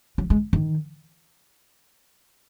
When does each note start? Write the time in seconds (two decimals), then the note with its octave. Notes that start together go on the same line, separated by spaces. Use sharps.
0.18 F#3
0.30 G#3
0.53 D#3